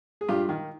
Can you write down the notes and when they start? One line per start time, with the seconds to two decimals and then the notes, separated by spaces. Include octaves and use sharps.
0.21 G#4
0.28 G2 F4 G4
0.49 D#3